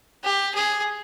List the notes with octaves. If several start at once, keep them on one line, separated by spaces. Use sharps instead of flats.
G4
G#4